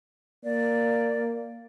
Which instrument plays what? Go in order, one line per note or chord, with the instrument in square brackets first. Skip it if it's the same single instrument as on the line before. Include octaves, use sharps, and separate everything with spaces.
[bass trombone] A#3 [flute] D5